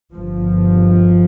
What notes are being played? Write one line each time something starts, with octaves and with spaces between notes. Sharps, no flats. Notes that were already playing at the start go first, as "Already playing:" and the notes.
G1 G2 F3